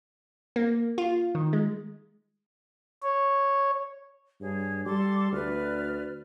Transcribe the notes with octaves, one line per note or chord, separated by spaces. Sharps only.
A#3
F4
D#3
G#3
C#5
G2 G#4 C#5
G3 A4 C6 D6
D2 B4 D5 F6